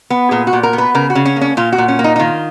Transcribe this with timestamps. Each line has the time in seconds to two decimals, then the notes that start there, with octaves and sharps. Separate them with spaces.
0.10 B3
0.31 A#2 G#4
0.47 F#4
0.53 A#2
0.63 A#4
0.73 B3
0.78 B4
0.95 C#3 A#4
1.10 F#4
1.15 C#3
1.26 C#4
1.36 A#3
1.41 C#4
1.57 A#2 F4
1.73 F#4
1.78 A#2
1.88 C#4
1.99 A#3
2.04 D#4
2.16 D#4
2.19 D#3 F4